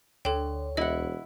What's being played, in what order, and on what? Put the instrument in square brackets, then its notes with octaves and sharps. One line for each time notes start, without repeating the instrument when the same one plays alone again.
[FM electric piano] D2 C#5 [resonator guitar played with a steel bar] D3 [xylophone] A4 G5
[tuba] E1 [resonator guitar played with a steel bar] E4 F#5 [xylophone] D#5